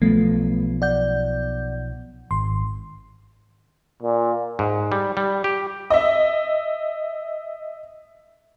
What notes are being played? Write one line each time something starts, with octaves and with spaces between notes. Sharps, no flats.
B1 F3 A3 B3
D5 F#5 G6
G#1 C6
A#2
G#2
G3
G3
G4
D#5 E5